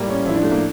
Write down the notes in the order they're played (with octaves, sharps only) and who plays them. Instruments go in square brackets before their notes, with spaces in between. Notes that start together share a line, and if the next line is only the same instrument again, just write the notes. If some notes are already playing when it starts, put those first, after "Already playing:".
Already playing: [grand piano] A2 G3 A#3
C#4
A2 F3 E4
D4
A3
A#3